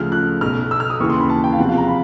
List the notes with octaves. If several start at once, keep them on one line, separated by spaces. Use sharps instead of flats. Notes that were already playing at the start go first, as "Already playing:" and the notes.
Already playing: D2 C#3 F3 F6
F#6
B1 B2 F6
E6
F6
D#6
D#2 C#3 E3 C#6
C6
B5
A5
G5
F5
E2 C3 F3 F#5
F5
A#5
B5